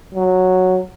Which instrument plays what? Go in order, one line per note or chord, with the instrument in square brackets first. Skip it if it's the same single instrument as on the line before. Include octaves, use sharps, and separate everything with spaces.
[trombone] F#3